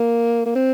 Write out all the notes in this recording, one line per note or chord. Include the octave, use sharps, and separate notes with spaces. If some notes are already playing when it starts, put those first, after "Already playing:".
Already playing: A#3
A#3
C4